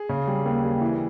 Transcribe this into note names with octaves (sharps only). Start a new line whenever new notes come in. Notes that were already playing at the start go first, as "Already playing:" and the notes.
Already playing: G#4
C#3
G3
D#2
G3
E3